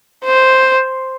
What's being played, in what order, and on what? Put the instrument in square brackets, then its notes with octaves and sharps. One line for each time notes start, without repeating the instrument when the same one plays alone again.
[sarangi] C5